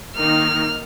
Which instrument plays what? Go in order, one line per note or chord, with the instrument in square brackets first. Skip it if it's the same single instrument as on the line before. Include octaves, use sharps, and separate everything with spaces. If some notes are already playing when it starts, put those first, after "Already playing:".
[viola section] D#3 A#3 D#4 [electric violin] F6